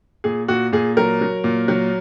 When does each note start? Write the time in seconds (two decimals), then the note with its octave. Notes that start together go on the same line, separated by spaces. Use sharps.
0.24 A#2 G#4
0.48 A#2 F#4
0.73 A#2 G#4
0.97 F#3 A#4
1.21 F#3
1.44 A#2
1.68 F#3